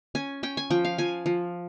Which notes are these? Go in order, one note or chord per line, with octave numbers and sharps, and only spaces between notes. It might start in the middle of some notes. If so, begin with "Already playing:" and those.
C#4 G#5
C#4 G5
G#5
F3 G5
F5
F3 G#5
F3